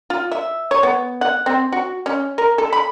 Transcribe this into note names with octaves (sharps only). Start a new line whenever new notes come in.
F4
E5
C#5
B3
F#5
C4
F#4
C#4
A#4
A4
B5